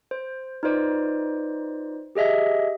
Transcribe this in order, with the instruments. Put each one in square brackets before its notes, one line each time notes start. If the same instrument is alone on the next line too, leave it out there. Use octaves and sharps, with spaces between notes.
[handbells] C5
D#4 F4 B4 C5 D5
G4 G#4 D#5 E5